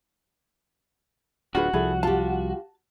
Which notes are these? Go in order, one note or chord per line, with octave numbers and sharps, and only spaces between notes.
D1 D4 F4 F#4 G#4 B4
C2 F3 G3 E4 G#4 A4
F4 G4 A5